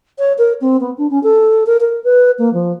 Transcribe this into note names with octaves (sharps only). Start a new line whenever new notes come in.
C#5
A#4
C4
B3
D4
C#4
A4
A#4
A#4
B4
A#3
F3